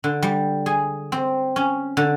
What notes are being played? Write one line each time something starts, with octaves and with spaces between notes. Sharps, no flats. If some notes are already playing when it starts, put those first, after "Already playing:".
D3
G3
G#4
C4
C#4
D3